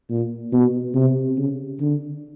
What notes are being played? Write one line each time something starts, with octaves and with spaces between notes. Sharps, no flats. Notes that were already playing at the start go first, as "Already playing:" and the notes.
A#2
B2
C3
C#3
D3